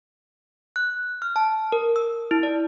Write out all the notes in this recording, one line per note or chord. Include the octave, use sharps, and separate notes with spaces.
F#6
F6
A5
A#4
E6
E4
D5